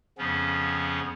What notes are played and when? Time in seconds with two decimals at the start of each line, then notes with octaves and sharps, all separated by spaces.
0.18 F2 C#3 F3 B3 C#4